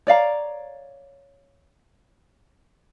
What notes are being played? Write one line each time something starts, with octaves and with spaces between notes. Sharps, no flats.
C#5 D5 F5 A#5